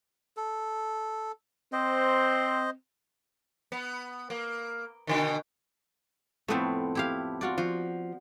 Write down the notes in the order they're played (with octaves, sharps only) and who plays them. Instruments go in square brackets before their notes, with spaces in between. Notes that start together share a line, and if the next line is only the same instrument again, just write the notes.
[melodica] A4
[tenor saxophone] C4 [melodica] C5 D#5
[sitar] B3
A#3
B2 D3 D#3
[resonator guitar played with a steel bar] F2 A2 [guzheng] A3 B3 C4
[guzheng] E4 G4 F5
F4 F#4 D5
[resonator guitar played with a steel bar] F3 [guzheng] F#4